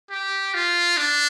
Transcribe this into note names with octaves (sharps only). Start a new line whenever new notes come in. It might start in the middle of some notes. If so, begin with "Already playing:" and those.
G4
F4
D4